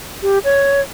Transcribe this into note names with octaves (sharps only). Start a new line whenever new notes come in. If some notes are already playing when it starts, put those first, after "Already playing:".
G4
C#5